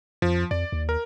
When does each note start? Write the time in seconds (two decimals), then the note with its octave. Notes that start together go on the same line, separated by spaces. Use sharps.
0.22 F2 F3
0.51 F2 D5
0.72 D#2
0.89 A#4